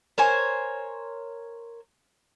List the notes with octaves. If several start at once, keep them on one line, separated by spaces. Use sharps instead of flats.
A#4 C5 C#5 G#5